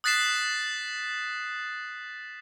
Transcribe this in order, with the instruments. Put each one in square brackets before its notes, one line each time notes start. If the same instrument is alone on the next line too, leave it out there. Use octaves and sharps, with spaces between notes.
[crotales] D#6 F#6 A6 B6 C7 E7